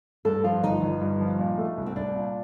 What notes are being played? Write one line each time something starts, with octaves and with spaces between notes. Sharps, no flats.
G2 A4
F3 F4
G1 D#4
G1
G2
F3
A#2
A3
C2
C4
C2 D4
A#2